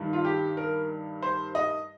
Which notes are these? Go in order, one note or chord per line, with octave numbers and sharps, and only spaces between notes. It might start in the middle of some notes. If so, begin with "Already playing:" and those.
Already playing: G2 D#3 G3
F4
G4
A#4
C5
D#5